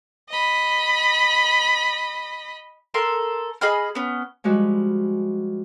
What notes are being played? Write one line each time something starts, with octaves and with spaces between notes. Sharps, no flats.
D#5 B5
A4 A#4 C6
G#4 D#5 B5 F6
B3 C#4
F3 G3 G#3 F#4 B4